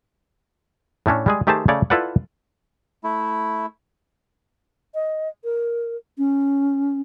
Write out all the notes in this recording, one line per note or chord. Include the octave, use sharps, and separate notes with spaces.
A2 A3 C#4 D4
G3 G#3 G#4
D#3 A3 G4 G#4 C5 A5
C#3 A3 C#5 D5
E4 F4 A4 B4 D5 F#5
A3 E4
D#5
A#4
C#4